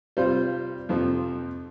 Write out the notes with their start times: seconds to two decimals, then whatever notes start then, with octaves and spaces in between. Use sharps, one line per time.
0.17 C3 G3 C4 F4 C5
0.89 F2 C3 F3 C4